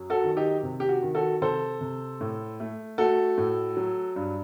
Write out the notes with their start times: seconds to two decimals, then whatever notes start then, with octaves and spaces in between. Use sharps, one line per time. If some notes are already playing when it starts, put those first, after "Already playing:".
Already playing: F#2 F#3
0.10 F#4 A4
0.24 D#3
0.37 D#4 G4
0.63 C3
0.80 G4
0.89 F#4
1.03 D#3
1.15 F#4 A4
1.42 C3 A4 C5
1.81 C3
2.21 A2
2.60 A3
2.98 A3 F#4 A4
3.38 A2
3.77 F#3
4.16 G2